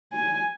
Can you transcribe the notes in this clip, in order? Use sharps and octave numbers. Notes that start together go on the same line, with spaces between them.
G#5